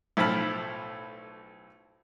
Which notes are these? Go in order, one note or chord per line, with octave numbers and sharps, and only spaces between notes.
B1 A2 F3 A5 B5 F6